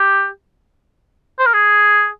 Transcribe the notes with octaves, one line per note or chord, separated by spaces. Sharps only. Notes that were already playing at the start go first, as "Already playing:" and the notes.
Already playing: G4
C5
A#4
G#4